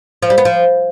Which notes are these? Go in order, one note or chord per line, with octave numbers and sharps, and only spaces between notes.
F3
G3
B3
F3